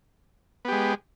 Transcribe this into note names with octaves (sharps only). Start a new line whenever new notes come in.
G#3 B3 G4